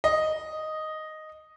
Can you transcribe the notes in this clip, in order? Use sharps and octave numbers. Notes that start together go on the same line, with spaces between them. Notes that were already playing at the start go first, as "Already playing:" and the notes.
D#5